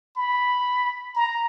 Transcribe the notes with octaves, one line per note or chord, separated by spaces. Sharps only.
B5
A#5